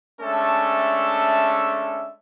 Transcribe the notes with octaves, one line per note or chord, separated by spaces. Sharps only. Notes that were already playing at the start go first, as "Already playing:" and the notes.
G#3 A3 C#4 D4 A4 E5